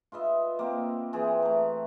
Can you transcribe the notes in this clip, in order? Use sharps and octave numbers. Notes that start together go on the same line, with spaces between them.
F4 B4 D#5 E5
A#3 C4
E3 C4 G#4
A3 A#5